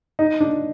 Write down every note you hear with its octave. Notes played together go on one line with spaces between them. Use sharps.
D#4
D4